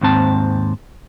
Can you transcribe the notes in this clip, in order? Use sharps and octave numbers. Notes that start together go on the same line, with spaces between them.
D#2 G#2 C4 A5